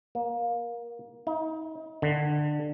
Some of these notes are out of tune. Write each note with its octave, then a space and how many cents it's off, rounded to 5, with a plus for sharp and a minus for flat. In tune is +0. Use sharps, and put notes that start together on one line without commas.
A#3 +20
D#4 +35
D3 +20